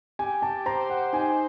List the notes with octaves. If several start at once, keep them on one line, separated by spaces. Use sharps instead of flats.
G4 G#5
A5
C5 A#5
F#5
D#4 G#5